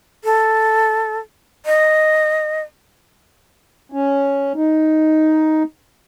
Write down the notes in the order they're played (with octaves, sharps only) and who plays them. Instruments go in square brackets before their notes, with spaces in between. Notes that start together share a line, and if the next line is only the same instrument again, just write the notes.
[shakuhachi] A4
D#5
[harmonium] C#4
D#4